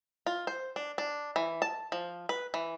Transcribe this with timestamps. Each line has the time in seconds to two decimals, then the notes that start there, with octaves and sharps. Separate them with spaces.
0.26 F4
0.47 C5
0.76 D4
0.98 D4
1.36 E3
1.62 A5
1.92 F3
2.29 B4
2.54 E3